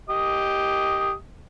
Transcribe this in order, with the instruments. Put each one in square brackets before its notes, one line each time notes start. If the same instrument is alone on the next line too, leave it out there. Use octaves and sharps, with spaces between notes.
[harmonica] G4 D#5 D#6